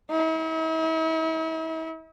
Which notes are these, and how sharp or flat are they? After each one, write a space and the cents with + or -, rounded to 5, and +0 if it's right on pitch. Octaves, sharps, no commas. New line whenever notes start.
E4 -45